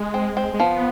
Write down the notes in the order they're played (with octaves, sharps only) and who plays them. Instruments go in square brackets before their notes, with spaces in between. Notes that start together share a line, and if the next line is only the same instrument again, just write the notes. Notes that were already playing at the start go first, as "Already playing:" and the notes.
Already playing: [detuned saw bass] G#3
[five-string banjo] C4
C4
[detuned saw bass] G#3
[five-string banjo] F3 [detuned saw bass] B3